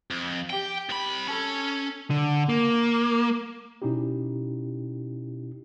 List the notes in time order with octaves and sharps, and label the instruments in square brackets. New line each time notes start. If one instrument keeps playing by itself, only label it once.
[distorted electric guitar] F2
[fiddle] G4 [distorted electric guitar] G5
[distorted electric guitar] C2 B5
[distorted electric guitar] C#4 [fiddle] A4
[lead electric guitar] D3
A#3
[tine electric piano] B2 C#4 D#4 E4 G4